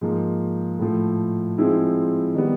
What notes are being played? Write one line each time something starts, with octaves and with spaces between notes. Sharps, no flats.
G#2 F3 A#3
A2 F3 A3
F3 G#3 C4 E4 G#4
D#3 G3 B3